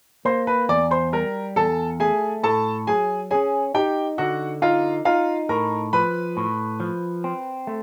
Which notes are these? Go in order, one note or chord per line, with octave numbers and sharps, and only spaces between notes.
A#3 C5 C6
B4 B5
E2 D5 D6
C5 C6
G3 A#4 A#5
E2 A4 A5
A3 G#4 G#5
A2 A4 A5
F#3 G#4 G#5
C#4 G#4 G#5
D#4 G4 G5
D3 F#4 F#5
D#4 F4 F5
D#4 F4 F5
A2 A#4 A#5
F3 B4 B5
A2
F3
C4
A3